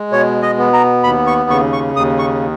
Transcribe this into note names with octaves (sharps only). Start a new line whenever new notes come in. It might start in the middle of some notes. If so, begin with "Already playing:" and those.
Already playing: G#3
B2 C#5
D#5
B3
A#5
D#2 B5
C#6
C#3 C#6
C#6
D#2 D#6
C#6